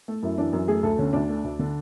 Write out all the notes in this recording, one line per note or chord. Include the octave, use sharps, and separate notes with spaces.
A3
F#2 E4
E3 D4
F#2
A3 G#4
D2 A4
D3 C#4
D2 D4
A3
D2
D3